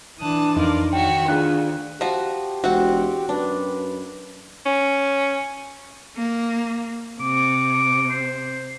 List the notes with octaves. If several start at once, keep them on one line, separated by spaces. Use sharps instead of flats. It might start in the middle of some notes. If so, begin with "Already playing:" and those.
E3 D4 A5 D#6 F#6
F2 D#4 F4 A#4 D5
D#3 F#4 C#5 E5 G5
D2 D4 F4 G#4 F5 F#6
F3 F#4 G4 A#5
E1 C4 F#4 F#5
F#2 D4 B4
C#4
A#3
C3 D6
C5